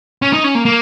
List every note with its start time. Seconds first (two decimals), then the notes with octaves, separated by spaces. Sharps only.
0.22 C#4
0.33 D#4
0.44 C#4
0.55 A#3
0.65 A#3